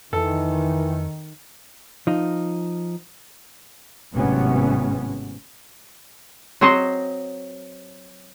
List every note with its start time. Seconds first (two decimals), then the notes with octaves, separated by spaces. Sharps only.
0.13 F2 D#3 E3 A4
2.07 F3 D#4
4.13 G#1 A2 C3 F#3 B3 C#4
6.61 F#3 C4 C5 C#5 D#5